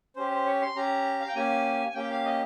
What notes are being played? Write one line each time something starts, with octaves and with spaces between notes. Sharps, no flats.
C#4 G4 C5
C5
C#5
C6
C#4 G4 A#5
F5
G5
A#3 C#4 G4 G#5
G#5
A#3 C#4 G4 G5
F5
D#5